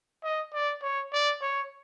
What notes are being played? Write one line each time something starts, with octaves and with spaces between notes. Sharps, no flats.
D#5
D5
C#5
D5
C#5